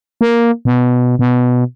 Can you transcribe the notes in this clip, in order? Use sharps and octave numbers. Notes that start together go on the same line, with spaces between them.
A#3
B2
B2